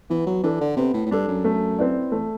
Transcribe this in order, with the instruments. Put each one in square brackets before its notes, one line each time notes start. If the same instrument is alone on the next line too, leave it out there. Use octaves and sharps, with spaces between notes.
[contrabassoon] E3 [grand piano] B3
[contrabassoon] F#3
[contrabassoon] E3 [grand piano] D4 A4
[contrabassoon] D3
[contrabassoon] C3 [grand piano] B3
[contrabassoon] A2
A2
[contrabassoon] G2 [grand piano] D4 A4
[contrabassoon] F#2
[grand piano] A3
C4 E4 B4 D5
[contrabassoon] E2 [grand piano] A3